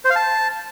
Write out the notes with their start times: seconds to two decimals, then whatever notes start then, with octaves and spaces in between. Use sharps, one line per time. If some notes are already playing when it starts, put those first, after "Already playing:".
0.05 C5
0.10 F5
0.16 A5